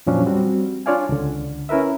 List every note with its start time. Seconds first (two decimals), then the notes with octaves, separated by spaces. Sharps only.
0.06 F2 A#2 F3 F#3 C#4 D4
0.26 G3 C4 F#4
0.86 D4 F4 C#5 D5 F5 G#5
1.09 C#2 D3
1.69 C#4 E4 A#4 B4 E5